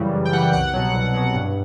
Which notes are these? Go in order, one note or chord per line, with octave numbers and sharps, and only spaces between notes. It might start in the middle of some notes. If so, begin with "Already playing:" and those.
Already playing: F#2 C#3 E3 G3
F#2
G5
C#3 E3 G3 F#5
C2 F#5
B2 F#3
C2
B2 F#3
G2